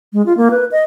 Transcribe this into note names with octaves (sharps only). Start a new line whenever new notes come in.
G#3
F4
A#3
B4
D#5